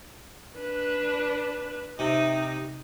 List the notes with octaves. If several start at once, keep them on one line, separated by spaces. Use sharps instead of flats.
D4 B4
C3 D#4